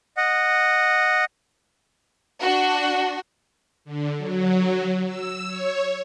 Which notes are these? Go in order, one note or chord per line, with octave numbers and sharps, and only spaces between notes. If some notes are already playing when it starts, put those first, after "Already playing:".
D#5 F#5
D4 F#4
D3
F#3
E6
C#5